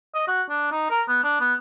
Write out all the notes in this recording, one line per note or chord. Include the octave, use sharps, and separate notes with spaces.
D#5
F#4
D4
D#4
A#4
B3
D4
B3